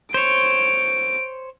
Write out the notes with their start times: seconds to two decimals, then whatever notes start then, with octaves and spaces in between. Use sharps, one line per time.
0.14 C5 C#5 D7